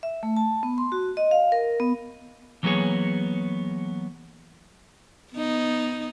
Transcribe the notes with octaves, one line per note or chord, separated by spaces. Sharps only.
E5
A3
A5
B3
C6
F#4
D#5
F5
A#4
B3
E3 F#3 A#3 B3 G#4 C#5
B3 D#4